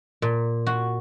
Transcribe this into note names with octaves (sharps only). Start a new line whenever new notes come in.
A#2
F#4